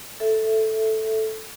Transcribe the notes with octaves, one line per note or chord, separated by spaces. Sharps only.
A4 E5